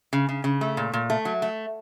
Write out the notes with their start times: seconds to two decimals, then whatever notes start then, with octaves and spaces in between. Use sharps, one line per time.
0.13 C#3
0.29 C#3
0.44 C#3
0.61 A3
0.77 A#2
0.93 A#2
1.10 A3
1.25 F#3
1.42 A3